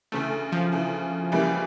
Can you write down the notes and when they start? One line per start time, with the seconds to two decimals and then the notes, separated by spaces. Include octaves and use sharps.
0.12 D2 C#3 E3 A3
0.52 F3
0.72 D2 C#3 E3
1.32 C#2 C#3 E3 G3 A#3